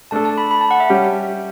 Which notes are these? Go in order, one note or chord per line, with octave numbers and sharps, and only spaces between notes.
A3 D4 A4 A5
A5
B5
B5
A5
F#5
E5
G3 C#4 G4